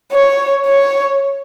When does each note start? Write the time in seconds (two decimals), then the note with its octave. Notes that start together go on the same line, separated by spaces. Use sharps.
0.12 C#5
0.66 C#5